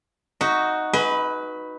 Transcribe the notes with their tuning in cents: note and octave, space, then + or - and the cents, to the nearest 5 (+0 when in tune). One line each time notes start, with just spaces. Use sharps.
D#4 +0 F#4 +0 E5 -20
B4 +0 D#5 +45 G#5 +0